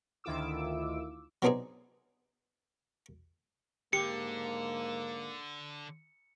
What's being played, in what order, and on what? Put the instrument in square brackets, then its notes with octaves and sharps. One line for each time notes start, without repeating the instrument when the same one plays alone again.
[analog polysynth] D2 D#3 E4 F4 D6 E6
[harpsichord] F#3 B3 C4 D4 D#4 G#4
[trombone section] G#2 A#3 [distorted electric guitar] D3 [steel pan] G4 [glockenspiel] C#7